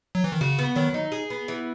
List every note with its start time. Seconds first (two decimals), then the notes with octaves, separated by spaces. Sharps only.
0.15 F#3
0.24 E3
0.32 D#3
0.41 C#3 F#4
0.59 B3
0.76 D#3 F#3
0.94 D#4
1.12 G#4
1.30 B3
1.48 E3